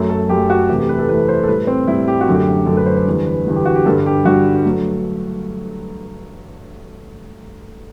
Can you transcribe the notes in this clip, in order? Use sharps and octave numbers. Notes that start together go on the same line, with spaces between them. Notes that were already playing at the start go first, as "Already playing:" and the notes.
Already playing: F#2 F#3 A3
A4
F#2 F#3 A3 G4
F#4
E2 C3 E3 A3 G4
G4
B4
A4
E2 C3 E3 A3 B4
C5
A4
A2 G3 B4
C4
A2 G3 E4
G4
F#4
F#2 D3 A3
G4
F#2 D3 A3 A4
B4
C5
C5
E2 D3 G3
B4
E2 D3 G3
G4
F#4
G4
G2 D3 G3 A4
G4
G2 D3 G3 F#4
F#3 A3